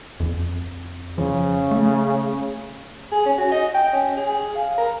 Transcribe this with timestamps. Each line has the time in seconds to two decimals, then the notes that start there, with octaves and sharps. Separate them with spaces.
0.20 F2
1.18 C#3 F3
1.71 A3
3.12 G#4
3.25 C#4
3.38 F#4
3.52 D#5
3.74 G5
3.93 C#4
4.17 G#4
4.55 F5
4.78 A#4